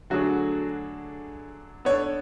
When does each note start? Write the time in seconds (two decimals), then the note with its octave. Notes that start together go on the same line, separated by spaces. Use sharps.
0.10 D3 F#3 A3 D4 F#4 G#4
1.85 B3 D4 A4 C#5 D5